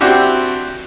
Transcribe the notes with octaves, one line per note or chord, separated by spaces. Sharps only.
C4 D4 E4 F#4 G4